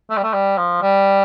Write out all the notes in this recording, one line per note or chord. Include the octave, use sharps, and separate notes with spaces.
A3
G3
A3
G3
F3
G3